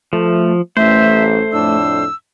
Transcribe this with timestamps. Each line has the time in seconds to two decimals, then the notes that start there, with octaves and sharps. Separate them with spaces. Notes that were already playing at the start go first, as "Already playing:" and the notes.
0.13 F3 A3
0.77 A1 A3 C5 E5
1.52 F2 A2 D4 E6